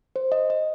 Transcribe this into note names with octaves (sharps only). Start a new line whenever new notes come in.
C5
D#5
D#5